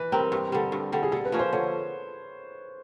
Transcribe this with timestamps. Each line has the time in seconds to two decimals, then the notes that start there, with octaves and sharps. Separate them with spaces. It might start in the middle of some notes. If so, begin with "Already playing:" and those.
Already playing: E3 B4
0.12 G3 C4 A#4
0.32 G2
0.52 D3 G3
0.72 G2
0.92 D3 G3
1.03 G#4
1.12 D3 A4
1.25 B4
1.32 F3 A#3 C#4
1.39 C5
1.53 D3 C#5